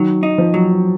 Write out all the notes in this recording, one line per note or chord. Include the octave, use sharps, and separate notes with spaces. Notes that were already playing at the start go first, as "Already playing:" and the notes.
Already playing: D#3 F#3
D#4
F3
F#3